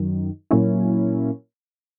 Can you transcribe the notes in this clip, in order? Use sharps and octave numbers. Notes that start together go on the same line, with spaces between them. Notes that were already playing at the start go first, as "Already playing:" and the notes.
Already playing: F#2 D#3 F#3
A#2 F#3 A#3 C#4 E4